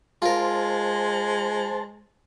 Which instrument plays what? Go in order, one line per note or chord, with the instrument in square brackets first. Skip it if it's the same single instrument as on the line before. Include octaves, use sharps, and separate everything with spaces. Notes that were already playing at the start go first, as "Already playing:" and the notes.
[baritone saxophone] G#3 [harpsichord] F4 A#4 [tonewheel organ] C5 A5